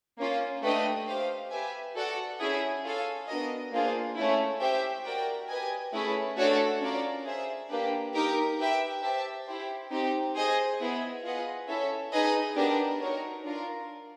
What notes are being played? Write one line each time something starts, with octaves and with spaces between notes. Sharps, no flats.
A#3 C#4 F4
A3 D4 G4 B4 D#5
G4 C5 F5
G4 B4 E5 G#5
F#4 A4 D5 F#5
C#4 E4 G#4
F4 A4 C#5 F5 G#5
B3 D4 F#4 A#4 D#5
A#3 D4 F4 G#4 C5
A3 C#4 E4
G4 C5 E5 G5
F#4 A#4 D5 G5
G4 B4 D#5 G#5
A3 C#4 E4 G#4 B4
A3 D4 F#4 A4 C#5
C#4 F4 A#4 D5
G#4 C5 E5
A#3 D4 G4 B4
D#4 G4 A#4
G4 B4 E5 G5
G4 C5 E5 A5
E4 G4 C5
C4 D#4 G4
G#4 C5 D#5 G#5
B3 E4 G#4
F4 G#4 B4 D#5 F#5
C#4 E4 A4 C#5 E5
D#4 G#4 B4 D#5
B3 D4 G4 A#4
D#4 F#4 A#4 C#5
D4 F4 A#4